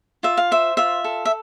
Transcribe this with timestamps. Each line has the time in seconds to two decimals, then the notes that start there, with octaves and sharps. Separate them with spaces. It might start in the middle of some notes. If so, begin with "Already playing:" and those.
0.23 F4 E5
0.37 F5
0.51 C5 E5
0.77 F4 E5
1.04 A4
1.25 E5